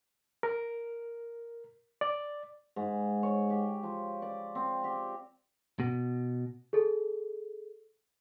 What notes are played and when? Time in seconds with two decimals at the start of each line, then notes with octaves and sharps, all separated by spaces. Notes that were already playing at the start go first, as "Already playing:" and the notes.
0.43 A#4
2.01 D5
2.76 G#2
3.23 C#5
3.50 G4
3.83 F3
4.22 D5
4.55 C4
4.84 G4
5.80 B2
6.73 G#4 A4